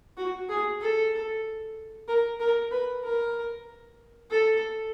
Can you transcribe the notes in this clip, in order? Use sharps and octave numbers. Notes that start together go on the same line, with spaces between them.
F#4
G#4
A4
A#4
A#4
B4
A#4
A4